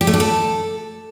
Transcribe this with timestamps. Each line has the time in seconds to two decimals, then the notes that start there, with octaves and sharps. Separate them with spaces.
0.01 G4
0.07 A3
0.14 D4
0.20 A4